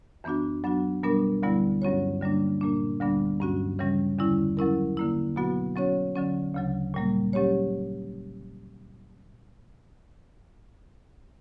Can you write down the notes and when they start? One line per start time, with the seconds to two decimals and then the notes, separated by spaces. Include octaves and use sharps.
0.24 F#2 E3 B3 D4 F#4
0.64 F#3 B3 D4 F#4
1.03 B2 G3 B3 D4 A#4
1.43 D2 D3 G3 B3 E4
1.82 G2 F#3 C#4 F#4 C#5
2.21 D3 G3 A#3 D4
2.61 A#2 A#3 D4
3.00 D2 D3 G3 B3 D4
3.40 G2 F#3 C#4 F#4
3.79 C#3 E3 G3 C#4
4.18 E2 D3 G3 C#4 E4
4.57 F#3 C#4 E4 A#4
4.97 D3 A#3 E4
5.36 B2 F#3 B3 F#4
5.76 F#3 C#4 F#4 C#5
6.15 D3 F#3 C#4
6.54 D2 C#3 F#3
6.94 A#2 G3 A#3
7.33 F#3 C#4 G4 C#5